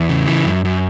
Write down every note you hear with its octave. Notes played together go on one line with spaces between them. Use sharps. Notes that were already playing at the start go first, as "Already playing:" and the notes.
Already playing: E2
C#3
E3
F#2
F#2